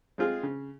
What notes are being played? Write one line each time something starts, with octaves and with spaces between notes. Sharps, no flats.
G#3 C4 F4 G#4
C#3